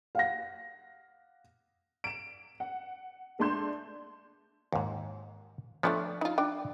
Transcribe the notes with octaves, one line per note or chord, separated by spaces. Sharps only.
F5 F#5 A#6
D7 E7
F#5
G#3 A3 D4 C6 G6 E7
D#2 G#2
F3 A3 B3 D4 C#5
D#4 F4
D4 G5